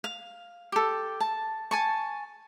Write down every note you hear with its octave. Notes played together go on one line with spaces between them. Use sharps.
F5
G4 A4
A5
G#5 A5 C#6